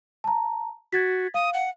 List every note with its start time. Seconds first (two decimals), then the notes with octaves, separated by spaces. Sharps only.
0.24 A5 A#5
0.93 F#4 G#6 A6 B6
1.34 F5 D#6
1.54 F#5